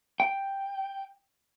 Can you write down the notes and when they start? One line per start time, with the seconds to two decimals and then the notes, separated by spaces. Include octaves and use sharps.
0.20 G5